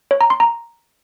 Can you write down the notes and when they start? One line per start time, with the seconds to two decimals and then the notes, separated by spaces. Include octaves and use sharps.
0.11 C#5
0.21 A#5
0.30 C6
0.40 A#5